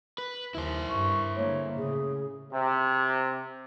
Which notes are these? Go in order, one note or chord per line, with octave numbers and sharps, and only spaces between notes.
B4
D#2 E4 C5
G2 C#6
D3 G#3 A#3 C#5
A2 C#3 G#4
C3